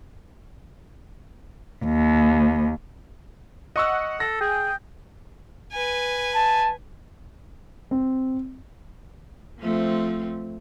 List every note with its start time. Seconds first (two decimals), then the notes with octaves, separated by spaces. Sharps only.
1.84 D#2
3.76 D#5 F#5 C#6 E6
4.20 A4 A#6
4.41 G#4 G5
5.72 B4 G#5
6.35 A5
7.91 C4
9.60 F3 A3 C4